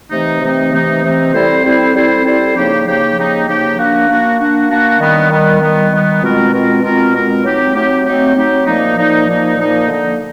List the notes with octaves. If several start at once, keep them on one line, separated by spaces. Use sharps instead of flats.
C3 E3 A3 C4 D#4
C3 E3 A3 C4 D#4
C3 E3 A3 C4 D#4
C3 E3 A3 C4 D#4
G3 C4 E4 A4 C5
G3 C4 E4 A4 C5
G3 C4 E4 A4 C5
G3 C4 E4 A4 C5
C#3 F3 A#3 D#4 G4
C#3 F3 A#3 D#4 G4
C#3 F3 A#3 D#4 G4
C#3 F3 A#3 D#4 G4
A#3 D4 F#4
A#3 D4 F#4
A#3 D4 F#4
A#3 D4 F#4
D#3 G3 B3
D#3 G3 B3
D#3 G3 B3
D#3 G3 B3
B2 G#3 C4 F4 A#4
B2 G#3 C4 F4 A#4
B2 G#3 C4 F4 A#4
B2 G#3 C4 F4 A#4
F#3 A3 C4 D#4 G4
F#3 A3 C4 D#4 G4
F#3 A3 C4 D#4 G4
F#3 A3 C4 D#4 G4
A#2 F3 A#3 D#4
A#2 F3 A#3 D#4
A#2 F3 A#3 D#4
A#2 F3 A#3 D#4
D3 F3 A#3 D#4